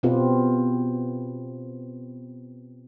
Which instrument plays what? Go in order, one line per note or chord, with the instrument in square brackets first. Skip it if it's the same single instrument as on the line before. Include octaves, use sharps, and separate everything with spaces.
[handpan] B2 B3 C4 F4 G4 B4